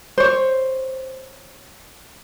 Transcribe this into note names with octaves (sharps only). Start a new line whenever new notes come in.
C5 C#5